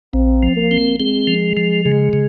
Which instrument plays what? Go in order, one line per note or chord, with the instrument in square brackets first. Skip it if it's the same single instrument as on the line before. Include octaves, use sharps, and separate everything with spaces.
[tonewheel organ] A#1 [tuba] C4
[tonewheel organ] F3
[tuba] A#3
[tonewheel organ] C4
[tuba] G#3 [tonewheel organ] C4
[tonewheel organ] F3
F3
[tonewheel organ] C#3 [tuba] G#3
[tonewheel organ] C#3